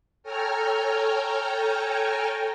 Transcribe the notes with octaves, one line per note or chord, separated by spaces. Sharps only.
A4 C#5 G5 G#5 A#5 F6